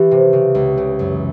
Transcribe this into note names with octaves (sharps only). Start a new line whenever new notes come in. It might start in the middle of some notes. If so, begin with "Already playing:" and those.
Already playing: E3 G4
C3
C#3
C#2
C#3
F#2